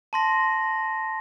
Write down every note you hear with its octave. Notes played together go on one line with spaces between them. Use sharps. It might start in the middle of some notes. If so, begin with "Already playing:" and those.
A5 C6 A#6